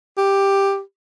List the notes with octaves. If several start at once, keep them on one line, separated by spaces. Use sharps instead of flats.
G4